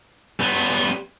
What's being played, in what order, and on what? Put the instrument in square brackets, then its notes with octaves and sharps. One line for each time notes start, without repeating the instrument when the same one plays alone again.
[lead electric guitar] G3 B3